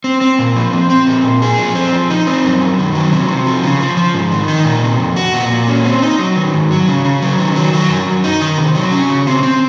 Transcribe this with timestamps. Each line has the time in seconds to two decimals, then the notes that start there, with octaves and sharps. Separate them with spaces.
0.04 C4
0.21 C4
0.39 A#2
0.56 F3
0.73 C4
0.90 C4
1.07 A#2
1.24 A#2
1.42 G#4
1.58 F3
1.75 C4
1.93 F3
2.10 D#4
2.27 C4
2.44 F#2
2.61 F#2
2.78 D#3
2.95 F#3
3.12 C3
3.28 C3
3.46 F3
3.64 C#3
3.80 F3
3.97 F3
4.14 G#2
4.32 D#3
4.48 D#4
4.65 A#2
4.83 C3
4.99 F2
5.16 F#4
5.34 A#2
5.52 A#2
5.68 C#4
5.85 C4
6.02 D#4
6.19 F#3
6.36 D#3
6.53 G#2
6.71 F#3
6.88 C#3
7.05 C#3
7.22 F#3
7.39 D#3
7.56 F#3
7.73 F#3
7.89 F#2
8.07 F#2
8.24 D#4
8.42 D#3
8.58 C3
8.75 F#3
8.92 C#4
9.10 C#3
9.27 C4
9.43 C4